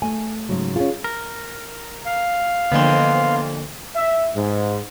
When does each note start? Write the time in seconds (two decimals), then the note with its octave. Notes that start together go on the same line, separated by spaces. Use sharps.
0.02 A3 G#5
0.49 G#2 C#3 F#3
0.76 C#4 F4 G#4
1.04 A#4
2.06 F5
2.72 F2 D3 E3 F3 A#3 B3 D4 C5
3.96 E5
4.34 G#2